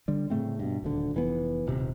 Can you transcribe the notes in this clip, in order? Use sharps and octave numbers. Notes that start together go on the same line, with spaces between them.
D3 G3
A2 C#3 A3 C4
G2 B2
D#1 D2 D3
F1 E3 B3
D#1 C3